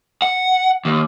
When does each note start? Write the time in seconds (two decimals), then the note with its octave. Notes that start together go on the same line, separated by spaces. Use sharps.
0.22 F#5
0.85 D#2